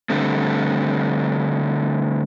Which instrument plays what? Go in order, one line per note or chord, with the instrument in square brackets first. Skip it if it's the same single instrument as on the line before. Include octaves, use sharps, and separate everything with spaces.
[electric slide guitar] D3 G3 A3 C4